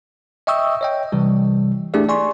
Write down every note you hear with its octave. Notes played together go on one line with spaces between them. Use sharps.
D#5 E5 G5 C#6 D#6 E6
C#5 D#5 G5
C3 E3 G3
A3 D4 E4 G4 G#4 D5
D5 G#5 C6 C#6